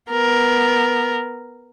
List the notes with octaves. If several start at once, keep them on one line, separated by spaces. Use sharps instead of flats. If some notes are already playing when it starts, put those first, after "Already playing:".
B3 A#4